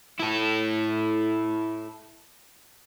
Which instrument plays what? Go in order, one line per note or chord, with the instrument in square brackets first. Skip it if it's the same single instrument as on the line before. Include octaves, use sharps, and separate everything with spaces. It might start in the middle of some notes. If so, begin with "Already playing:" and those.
[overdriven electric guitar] E4 A4